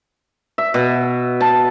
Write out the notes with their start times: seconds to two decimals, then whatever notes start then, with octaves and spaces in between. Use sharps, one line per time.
0.58 E5
0.74 B2
1.41 A5